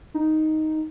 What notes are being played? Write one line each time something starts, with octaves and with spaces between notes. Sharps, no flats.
D#4